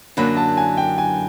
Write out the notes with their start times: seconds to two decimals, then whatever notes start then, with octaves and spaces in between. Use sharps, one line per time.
0.17 F#2 D3 F#3 A#3 D4 B5
0.37 A5
0.57 G#5
0.77 G5
0.98 G#5